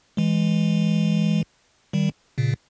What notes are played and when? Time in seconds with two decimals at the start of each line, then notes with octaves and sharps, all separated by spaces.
0.17 E3 G#3
1.93 D#3 G3
2.38 A#2 C#3